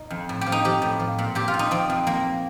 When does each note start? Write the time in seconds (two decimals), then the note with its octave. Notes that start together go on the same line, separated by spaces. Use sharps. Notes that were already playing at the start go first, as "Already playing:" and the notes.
Already playing: A#2 D#4
0.11 F2
0.29 A2
0.41 G4
0.46 F3
0.52 D#4
0.65 F3 G4
0.82 A2
1.00 F3
1.19 A#2
1.35 A#2 G4
1.48 F4
1.54 A#2
1.59 D#4
1.71 F3 C4
1.90 F2
2.07 F2 A#3